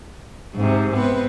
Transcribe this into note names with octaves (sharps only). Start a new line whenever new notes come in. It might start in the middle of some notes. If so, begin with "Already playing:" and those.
G#2 C3
B3 C4 B4